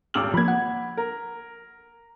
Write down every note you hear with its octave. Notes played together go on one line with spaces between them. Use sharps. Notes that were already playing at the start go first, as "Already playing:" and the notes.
D#1 G#1 D6 E6 F6 F#7
F3 A#3 B5 G#6
F#5
A#4